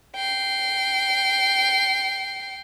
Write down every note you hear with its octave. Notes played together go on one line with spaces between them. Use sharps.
G5 C7